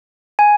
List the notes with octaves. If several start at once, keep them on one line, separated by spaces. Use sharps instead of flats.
G#5